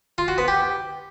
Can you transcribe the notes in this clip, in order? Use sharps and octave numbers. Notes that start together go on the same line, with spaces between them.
F4
F#4
B3
G4